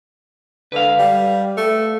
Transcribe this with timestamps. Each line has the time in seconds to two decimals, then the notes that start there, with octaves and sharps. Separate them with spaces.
0.72 D3 B4 F5
0.98 G3
1.57 A3